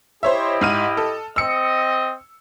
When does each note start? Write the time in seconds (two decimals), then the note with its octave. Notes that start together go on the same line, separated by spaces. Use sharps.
0.23 E4 G4 C5 C#5 D#5 E5
0.61 G#2 F6 D#7
0.97 A4
1.36 C4 D#5 E6 C#7